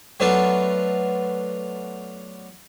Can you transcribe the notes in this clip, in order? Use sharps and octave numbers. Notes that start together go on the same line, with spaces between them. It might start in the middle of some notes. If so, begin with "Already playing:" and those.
F#3 A3 B3 D4 F4 B4